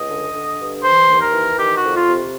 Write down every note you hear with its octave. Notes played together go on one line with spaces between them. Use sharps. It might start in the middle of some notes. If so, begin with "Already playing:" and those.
Already playing: C#2 D#5
D3
D3
G2
E3 C5
D#2
A#4
E3
D#3 G4
F#4
F2
F4
C3